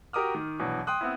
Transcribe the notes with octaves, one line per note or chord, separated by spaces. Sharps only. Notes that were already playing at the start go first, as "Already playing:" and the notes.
F#4 G4 A#4 D6 D#6 F6
D#3
G2 B2 E3 F#3
G5 C6 D#6 F#6
B3 C4 E4